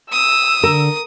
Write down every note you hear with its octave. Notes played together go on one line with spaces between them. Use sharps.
D#6 E6
D3 A#4